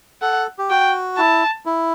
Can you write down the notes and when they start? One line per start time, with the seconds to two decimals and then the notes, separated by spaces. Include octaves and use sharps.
0.22 A4 F#5
0.59 G4
0.70 F#4 G5
1.18 E4 A5
1.66 E4